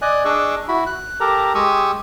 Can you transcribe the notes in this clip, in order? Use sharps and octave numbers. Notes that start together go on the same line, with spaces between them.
D5 D#5 G#5 F#6
D4 G#4 D#5 C#6 D6 E6
E4 F#4 B5
F#6
G4 A4 A#4 A#5
G#3 G4 C#6 D#6 E6